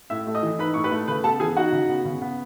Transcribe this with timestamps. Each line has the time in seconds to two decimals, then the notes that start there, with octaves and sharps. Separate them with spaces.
0.10 A2 E5 E6
0.27 A3
0.35 D#5 D#6
0.43 E3
0.59 D#4 B4 B5
0.74 A2 C#6
0.84 B4 B5
0.92 A3
1.08 C#3 B4 B5
1.24 B3 A4 A5
1.40 E3 G#4 G#5
1.56 D#4 F#4 F#5
1.72 C#3
1.89 B3
2.05 C#3
2.22 B3